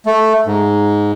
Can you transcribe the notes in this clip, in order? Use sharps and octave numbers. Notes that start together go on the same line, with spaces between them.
A3
G#2